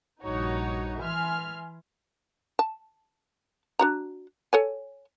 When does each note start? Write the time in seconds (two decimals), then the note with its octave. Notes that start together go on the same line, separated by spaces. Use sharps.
0.24 A#1 G2 D#4 F#4 C#5
1.00 E3 E5 G#5 C6 F6
2.59 A5
3.79 D4 F#4 A#5
4.53 A4 C#5 G#5